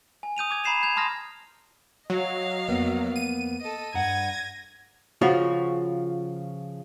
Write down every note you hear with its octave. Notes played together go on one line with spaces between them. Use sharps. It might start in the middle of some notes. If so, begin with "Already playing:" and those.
G#5
D#6 G6 D#7 F7
D6 G#6
A#5 B5 G#6 C7 E7 F7
G6 G#6 F7
A5 A#5 C6 D#6 F6 A#6
F#3 D#5 F5
F2 A#3 B3
D#7
A4 D#5
G2 F#5 A#5 G#6 A#6
C#3 F3 F4 F#4